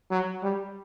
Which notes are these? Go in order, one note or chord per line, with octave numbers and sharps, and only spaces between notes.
F#3
G3